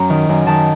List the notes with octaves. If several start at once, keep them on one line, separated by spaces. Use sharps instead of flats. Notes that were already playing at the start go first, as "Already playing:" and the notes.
Already playing: F#2 A#5
D#3
F#2
D#3 A5